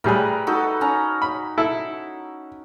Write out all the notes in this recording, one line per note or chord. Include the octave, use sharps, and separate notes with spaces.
A2 G3 G#4 A#4 B4
D#4 F#4 A4
C#4 A#5
B5
E4 A4